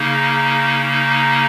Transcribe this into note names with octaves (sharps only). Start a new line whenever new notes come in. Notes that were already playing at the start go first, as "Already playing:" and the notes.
Already playing: C#3 A#3 D#4
D#4